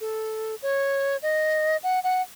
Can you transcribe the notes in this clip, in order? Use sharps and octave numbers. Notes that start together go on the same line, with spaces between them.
A4
C#5
D#5
F#5
F#5